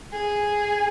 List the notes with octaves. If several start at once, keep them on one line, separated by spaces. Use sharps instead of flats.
G#4